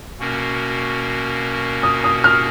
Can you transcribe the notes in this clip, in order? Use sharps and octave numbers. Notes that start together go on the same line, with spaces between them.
B2 A#3 C#4 F#4 A#4
D#6
D#6
F6